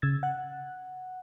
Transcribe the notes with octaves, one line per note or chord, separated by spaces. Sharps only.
C#3 E6 G#6 A6
F#5 F#6